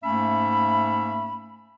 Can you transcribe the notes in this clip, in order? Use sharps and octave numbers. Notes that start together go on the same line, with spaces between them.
G#2 A3 A#3 C#4 E5 B5